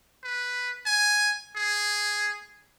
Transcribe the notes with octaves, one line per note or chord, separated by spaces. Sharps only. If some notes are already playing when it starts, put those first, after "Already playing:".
B4
G#5
G#4